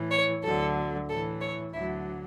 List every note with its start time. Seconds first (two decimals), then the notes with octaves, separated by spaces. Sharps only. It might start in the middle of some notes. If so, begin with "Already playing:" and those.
Already playing: A2 E3
0.10 C#5
0.43 D2 D3 F#3 A4
1.08 A2 E3 A4
1.41 C#5
1.73 D2 D3 F#3 E4